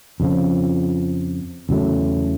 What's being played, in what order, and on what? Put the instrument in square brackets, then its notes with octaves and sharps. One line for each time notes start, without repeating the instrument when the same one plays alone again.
[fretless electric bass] F2 C#3 F3
E2 C#3 F#3 A3